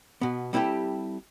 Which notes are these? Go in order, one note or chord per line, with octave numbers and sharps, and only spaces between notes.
B2 B3
G3 C4 E4 F4 G4 A4